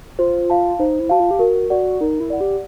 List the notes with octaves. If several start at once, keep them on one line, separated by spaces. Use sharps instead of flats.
F4 C5
F5 A5
D#4 C5
E4
F#4 F5 A5
F4
G4
F#4 A#4
F#4 D5 F#5
D#4 A#4
E4
D5 F#5
G4